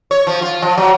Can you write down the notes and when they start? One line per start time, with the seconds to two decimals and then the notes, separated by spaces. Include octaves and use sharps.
0.11 C#5
0.27 F3
0.42 F4
0.62 F3
0.78 F#3